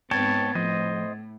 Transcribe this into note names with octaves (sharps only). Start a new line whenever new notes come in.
G#2 B3 C4 C#5 G5 A5 G#6 A6
A2 F3 C5 D#5